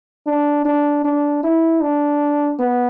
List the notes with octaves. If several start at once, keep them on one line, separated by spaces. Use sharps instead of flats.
D4
D4
D4
E4
D4
B3